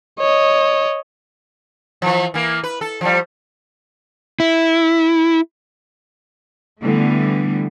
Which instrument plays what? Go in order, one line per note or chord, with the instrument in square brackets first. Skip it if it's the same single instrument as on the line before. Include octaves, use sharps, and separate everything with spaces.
[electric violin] C#5 D#5
[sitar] E3 F3
E3 A#3
B4
A4
F3 G3
[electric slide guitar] E4
[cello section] D3 E3 G3 A3 B3